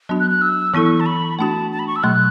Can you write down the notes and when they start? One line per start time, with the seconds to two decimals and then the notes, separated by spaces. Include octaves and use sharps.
0.09 F#3 B3 D4 F#4
0.20 F#6
0.31 F#6
0.42 E6
0.74 E3 B3 E4 A4 C#6
1.00 A5
1.06 B5
1.39 A3 D4 F#4 A5
1.71 A5
1.79 B5
1.87 C#6
1.96 E6
2.03 B2 F#3 A3 F#6